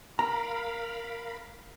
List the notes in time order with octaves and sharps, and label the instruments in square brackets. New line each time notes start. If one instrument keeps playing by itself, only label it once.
[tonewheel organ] A#4 F5 B5 [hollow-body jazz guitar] A#5